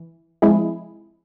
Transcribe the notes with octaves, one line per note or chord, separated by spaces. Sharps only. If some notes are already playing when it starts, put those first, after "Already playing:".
Already playing: E3
C3 F3 G#3 E4 G#4